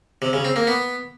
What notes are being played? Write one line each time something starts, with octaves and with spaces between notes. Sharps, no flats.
C3
C#3
C4
A#3
B3